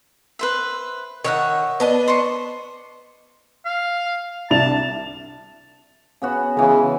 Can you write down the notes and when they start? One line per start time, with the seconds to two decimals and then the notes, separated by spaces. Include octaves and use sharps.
0.39 B4 C5 E5
1.24 D#3 C#5 E5 F#5
1.80 B3 D4 D#5
2.08 C5 C6 C#6
3.66 F5
4.51 C2 D4 A5 F7
6.22 C#3 B3 F#4
6.57 C#3 E3 G#3